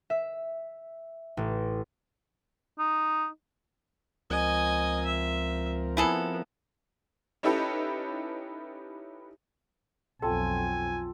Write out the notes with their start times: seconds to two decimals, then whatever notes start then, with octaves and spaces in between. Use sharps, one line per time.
0.10 E5
1.37 A1
2.79 D#4
4.30 C#2 F3 C4 A#4 D#5 G#5
5.06 E5
5.97 B3 E4 G#4 A4
7.43 C#4 D#4 E4 G4 A4 B4
10.22 B1 F2 C4 F4 A4 G#5